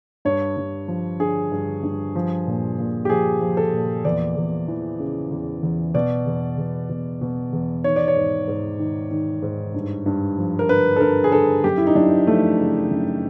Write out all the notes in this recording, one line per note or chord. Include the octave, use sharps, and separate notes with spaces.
G2 C#5
G2
F3
D3 G#4
G2
G2
F3
A#2
A#2
G4
F3 G#4
F3
A4
A#2
E2 D5
E2
E3
C#3
E2
E2
B2 D5
E2
E2
B2
B2
E2
D#3 C#5
D5
C#5
G#2
G#2
D#3
D#3
G#2
G2
G2
F3
A#4
D3 B4
A4
G2 A#4
G#4
G2 A4
F#2 G4
E4
D#4
F#2 D4
F3 A3
C#3
F#2